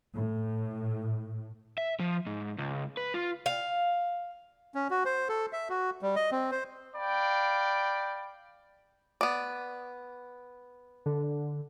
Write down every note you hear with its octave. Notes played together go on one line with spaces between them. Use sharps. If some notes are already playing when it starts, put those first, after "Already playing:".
A2
E5
F3
G#2
C#2
B4
F4
F5
C#4
F#4
C5
A4
E5
F#4
G3
D#5
C4
C5
D5 F5 G5 B5
B3 D5
D3